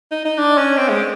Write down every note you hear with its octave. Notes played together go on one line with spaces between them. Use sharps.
D#4
D#4
D4
C#4
C4
G#3